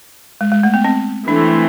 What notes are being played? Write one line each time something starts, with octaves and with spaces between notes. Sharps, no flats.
G#3
G#3
A3
B3
C4
E3 A3 C4 D4